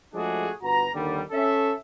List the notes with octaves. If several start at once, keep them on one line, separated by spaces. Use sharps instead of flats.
F3 G#3 A3 D4 F#4 G#4
G1 F#4 B4 A#5
D#2 D3 D#3 G3
C#4 A4 E5